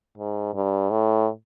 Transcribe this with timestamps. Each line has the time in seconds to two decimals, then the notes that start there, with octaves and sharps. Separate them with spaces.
0.18 G#2
0.54 G2
0.90 A2